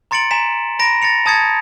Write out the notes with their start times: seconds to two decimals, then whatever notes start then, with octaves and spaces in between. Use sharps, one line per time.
0.11 A#5 C6 A6 C#7 D7 F#7
0.31 G#5 A#5 B6 E7
0.79 A#5 B5 A#6 D7
1.02 A6 A#6 C#7 F7
1.26 A5 D#6 G#6 A6 C#7